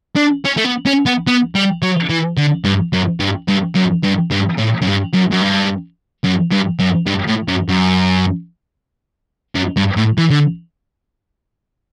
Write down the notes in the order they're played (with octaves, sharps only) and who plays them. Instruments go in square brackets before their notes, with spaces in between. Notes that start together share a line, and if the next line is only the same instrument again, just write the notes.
[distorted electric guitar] D4
C#4
A3
B3
C#4
B3
B3
G3
F#3
E3
D3
G2
F#2
G2
G2
F#2
G2
G2
A2
F#2
G2
F#2
F#2
G2
F#2
G2
F#2
G2
A2
F#2
F#2
F#2
G2
A2
E3
D3